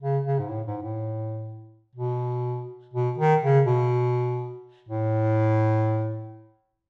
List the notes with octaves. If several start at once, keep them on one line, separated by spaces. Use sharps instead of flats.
C#3
C#3
G#2
A2
G#2
A2
B2
B2
D#3
C#3
B2
A2